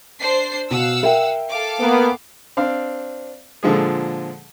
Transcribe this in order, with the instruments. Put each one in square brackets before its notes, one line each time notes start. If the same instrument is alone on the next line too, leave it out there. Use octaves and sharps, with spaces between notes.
[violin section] D4 C5 C7
[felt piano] B2 [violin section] F5 F#5 E6
[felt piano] A#4 E5 G5
[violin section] A4 F5 D6
[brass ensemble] A#3 B3
[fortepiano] C4 D4 F5
A#2 D3 F3 G#3 G#4